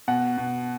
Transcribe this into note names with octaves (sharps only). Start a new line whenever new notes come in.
B2 F#5
B2